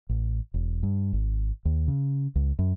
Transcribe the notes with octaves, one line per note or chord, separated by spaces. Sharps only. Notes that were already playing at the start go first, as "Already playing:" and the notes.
A1
E1
G2
G#1
D#2
C#3
C#2
F#2